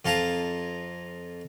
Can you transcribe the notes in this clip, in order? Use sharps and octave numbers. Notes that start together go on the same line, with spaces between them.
F2 F4 A5 A#5